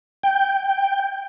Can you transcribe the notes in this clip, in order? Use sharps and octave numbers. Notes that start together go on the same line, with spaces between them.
G5